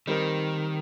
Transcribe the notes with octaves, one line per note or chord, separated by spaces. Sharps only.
D#3 G3 C4 D#4 A#4